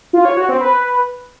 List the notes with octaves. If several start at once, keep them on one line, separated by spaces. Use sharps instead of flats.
F4
C#5
F#4
C4
B4